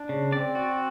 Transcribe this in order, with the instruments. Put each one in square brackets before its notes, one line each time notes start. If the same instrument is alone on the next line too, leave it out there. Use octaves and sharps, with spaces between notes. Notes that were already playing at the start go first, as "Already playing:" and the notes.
Already playing: [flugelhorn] D4
[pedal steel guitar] C#3
[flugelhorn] C4 [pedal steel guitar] D5
[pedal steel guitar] F#4